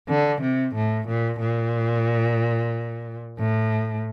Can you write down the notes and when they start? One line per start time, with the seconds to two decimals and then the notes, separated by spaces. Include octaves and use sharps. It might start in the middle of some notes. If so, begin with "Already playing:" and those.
0.09 D3
0.41 C3
0.74 A2
1.08 A#2
1.40 A#2
3.38 A2